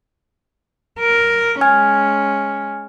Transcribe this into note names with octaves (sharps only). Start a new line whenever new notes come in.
A#4
G#3 C#4 G#5 F6 G#6